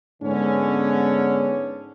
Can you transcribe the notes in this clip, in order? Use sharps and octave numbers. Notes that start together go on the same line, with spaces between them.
G#2 D3 B3 C#4